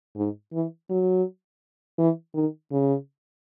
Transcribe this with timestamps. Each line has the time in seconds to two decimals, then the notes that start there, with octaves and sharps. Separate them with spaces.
0.16 G#2
0.53 E3
0.90 F#3
1.98 E3
2.34 D#3
2.72 C#3